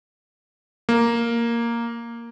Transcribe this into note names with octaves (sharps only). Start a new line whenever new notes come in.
A#3